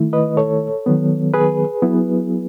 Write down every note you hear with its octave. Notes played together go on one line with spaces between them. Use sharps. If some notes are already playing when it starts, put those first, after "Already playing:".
Already playing: D#3 A3 E4
B4 D#5
A4 C#5
D#3 F#3 B3
G#4 B4
F#3 B3 E4